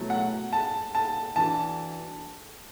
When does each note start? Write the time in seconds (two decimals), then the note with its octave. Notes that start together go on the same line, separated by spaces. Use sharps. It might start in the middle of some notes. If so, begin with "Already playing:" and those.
Already playing: B2 F#3 A3 E4
0.10 F#5
0.53 A5
0.95 A5
1.36 E3 D4 F#4 A5